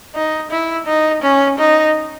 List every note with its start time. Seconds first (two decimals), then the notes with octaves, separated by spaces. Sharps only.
0.15 D#4
0.51 E4
0.87 D#4
1.22 C#4
1.58 D#4